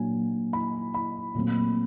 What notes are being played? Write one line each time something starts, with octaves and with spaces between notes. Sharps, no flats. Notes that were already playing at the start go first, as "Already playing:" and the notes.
Already playing: A#2 F#3 A#3 D4 G#5
B5
B5
A#2 F#3 A3 C4